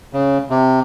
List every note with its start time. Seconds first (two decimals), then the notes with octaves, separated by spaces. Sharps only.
0.13 C#3
0.50 C3